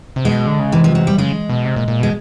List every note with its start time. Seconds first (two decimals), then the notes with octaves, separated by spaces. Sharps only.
0.16 C3
0.25 B2 G#3
0.47 D3
0.59 C#3
0.72 C3 E3
0.84 F3
0.95 F#3
1.07 G3
1.18 C#3 G#3
1.49 B2
1.65 C3
1.76 A#2
1.88 A#2
2.00 B2 G#3